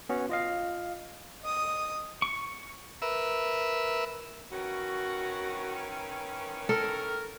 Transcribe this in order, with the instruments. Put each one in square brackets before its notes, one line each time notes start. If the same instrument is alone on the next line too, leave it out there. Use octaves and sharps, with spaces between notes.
[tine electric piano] B3 C#4 F#4
F4 D#5 F5
[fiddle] D#5 D#6
[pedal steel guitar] C#6
[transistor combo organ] A#4 B4 E5 E6
[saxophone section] D#3 E3 C#4 [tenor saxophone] F#4
[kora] A4 [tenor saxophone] A#4